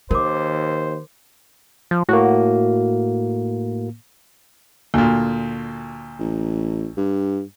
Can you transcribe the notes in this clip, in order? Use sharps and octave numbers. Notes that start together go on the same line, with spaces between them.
D#2 D#3 A#4 C5 D6
F3
A2 A#3 F#4
D2 A#2 A#3 F#4
A1
G2